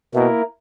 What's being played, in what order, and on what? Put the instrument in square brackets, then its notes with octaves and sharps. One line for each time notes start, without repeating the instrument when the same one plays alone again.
[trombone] B2 [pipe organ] A#3 E4 A#4